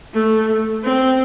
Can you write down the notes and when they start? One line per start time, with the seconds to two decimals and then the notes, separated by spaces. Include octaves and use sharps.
0.14 A3
0.84 C4